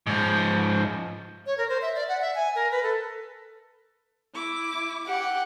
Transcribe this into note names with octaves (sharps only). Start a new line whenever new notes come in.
G#2 F3
C#5
A#4
C5
E5
D5
F#5
E5
G#5
A#4
B4
A4
E4 D6
G4 F#5